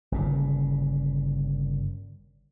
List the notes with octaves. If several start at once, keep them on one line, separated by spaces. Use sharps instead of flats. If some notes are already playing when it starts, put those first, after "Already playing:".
G1 A#2 C#3